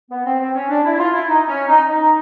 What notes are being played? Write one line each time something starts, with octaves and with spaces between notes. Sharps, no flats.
B3
C4
C4
C#4
D4
E4
E4
F4
E4
D#4
C#4
D#4
D#4